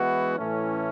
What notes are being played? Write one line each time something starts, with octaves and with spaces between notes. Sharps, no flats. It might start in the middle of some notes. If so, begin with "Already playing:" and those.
Already playing: E3 G#3 B3 E4 F#4
A2 E3 A3 C#4